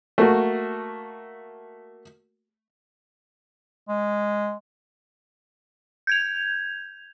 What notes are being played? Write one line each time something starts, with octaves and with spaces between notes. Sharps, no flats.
A3 A#3 F#4
G#3
G6 G#6 F7